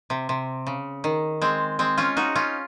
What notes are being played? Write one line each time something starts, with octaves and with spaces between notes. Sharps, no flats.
C3
C3
C#3
D#3
G#3 C4
G#3 C4
C#4 F4
D#4 F#4
C#4 F4